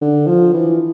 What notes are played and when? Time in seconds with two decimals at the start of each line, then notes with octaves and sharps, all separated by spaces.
0.01 D3
0.27 F3
0.54 E3